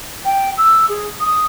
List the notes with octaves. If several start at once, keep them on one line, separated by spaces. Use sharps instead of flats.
G5
E6
G#4
D#6